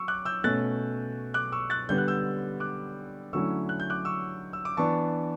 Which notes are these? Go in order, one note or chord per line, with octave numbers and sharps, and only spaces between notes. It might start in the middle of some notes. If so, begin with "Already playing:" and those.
Already playing: F#3 C#6 E6
D6 F#6
E6 G6
B2 A3 C#4 F#6 A6
D6 F#6
C#6 E6
F#6 A6
D3 G3 B3 G6
F#6
E6 G6
D6 F#6
D3 F#3 A3 C#4 E4 C#6 E6
F#6
G6
D6 F#6
C#6 E6
E6
D6
E3 B3 D4 A5 C#6